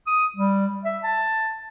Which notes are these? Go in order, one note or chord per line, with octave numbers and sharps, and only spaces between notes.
D#6
G3
E5
A5